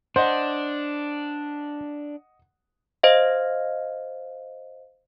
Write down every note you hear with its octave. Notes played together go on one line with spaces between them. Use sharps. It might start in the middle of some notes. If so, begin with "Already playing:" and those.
D4 C5 D#5 F#5
C5 D#5 F5